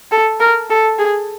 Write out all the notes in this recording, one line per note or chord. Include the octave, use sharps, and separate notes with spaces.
A4
A#4
A4
G#4